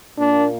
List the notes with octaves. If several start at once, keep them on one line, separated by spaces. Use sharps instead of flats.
A#2 A#3 D4